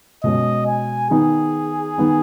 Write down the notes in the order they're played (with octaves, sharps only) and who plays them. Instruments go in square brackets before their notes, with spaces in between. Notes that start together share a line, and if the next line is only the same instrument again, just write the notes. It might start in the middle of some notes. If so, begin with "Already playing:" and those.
[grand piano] B2 G#3 C#4 [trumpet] D#5
[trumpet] G#5
[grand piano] D#3 B3 D#4 [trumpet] G#4
[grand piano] D#3 B3 D#4